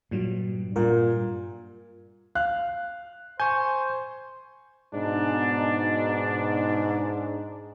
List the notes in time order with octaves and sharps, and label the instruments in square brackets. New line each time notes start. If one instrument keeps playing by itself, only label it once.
[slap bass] G2 [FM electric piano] A#2 F#3
[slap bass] G2 [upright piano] A#2 [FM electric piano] A#4
[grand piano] F5 F#6
[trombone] C5 [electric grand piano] G#5 [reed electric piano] C#6 G6
[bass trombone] G#2 [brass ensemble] B2 D#4 [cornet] D4